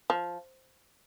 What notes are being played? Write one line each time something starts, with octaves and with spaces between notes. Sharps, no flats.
F3